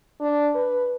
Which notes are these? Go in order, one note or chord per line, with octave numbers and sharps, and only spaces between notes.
D4
B4